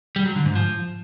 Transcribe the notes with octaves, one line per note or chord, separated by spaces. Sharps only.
G3
F#3
D3
G#2
F3